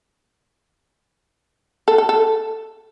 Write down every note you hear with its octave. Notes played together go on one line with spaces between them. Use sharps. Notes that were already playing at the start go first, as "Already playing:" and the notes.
A4
A4
A4